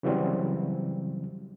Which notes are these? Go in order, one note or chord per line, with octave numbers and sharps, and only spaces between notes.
C#3 E3 F#3 G3 C4